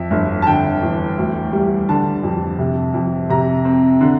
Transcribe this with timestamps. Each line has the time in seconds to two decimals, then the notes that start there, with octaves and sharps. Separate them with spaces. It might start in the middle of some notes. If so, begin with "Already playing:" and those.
Already playing: F2 E5
0.11 G1
0.42 A5
0.47 D3 G5
0.82 E2
1.18 D2
1.52 G3
1.89 D3 A5
2.23 F2
2.59 C3
2.94 F2
3.30 C3 A#5
3.65 C4
4.01 D3